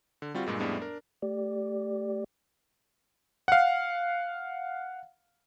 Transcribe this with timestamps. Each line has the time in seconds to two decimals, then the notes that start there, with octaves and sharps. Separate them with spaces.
0.22 D3
0.34 G3 C4 F4 F#4
0.46 G2 A#2 G#3
0.59 F2 A2 G3 G#3 B3 D4
0.77 D4 A#4
1.22 A3 G4 D5
3.48 F5 F#5